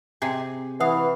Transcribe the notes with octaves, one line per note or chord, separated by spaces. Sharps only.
C3 G#4
E3 F5 F#5 D#6